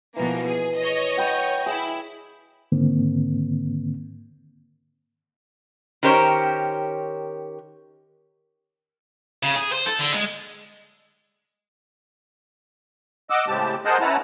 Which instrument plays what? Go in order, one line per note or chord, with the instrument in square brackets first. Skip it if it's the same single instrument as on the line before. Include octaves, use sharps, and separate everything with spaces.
[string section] B2 F3 A#3 [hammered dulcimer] E3
[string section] G#4
C#5 D#5
[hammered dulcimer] F#5 G5 B5
[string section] E4 [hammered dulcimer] G#4
[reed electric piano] G#2 D3 D#3 A#3 C4
[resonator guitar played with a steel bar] D#3 C#4 G4 A#4 C5 C#5
[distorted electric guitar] C#3
G#4
C5
A4
D3
G#3
[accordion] D#5 F#5 D6 E6
A2 C#3 G#3 C4 G4 A5
G#4 A#4 C5 D#5 F#5 A5
C#4 E4 B4 F#5 A5 A#5